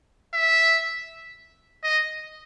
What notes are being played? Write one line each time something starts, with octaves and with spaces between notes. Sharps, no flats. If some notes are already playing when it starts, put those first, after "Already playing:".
E5
D#5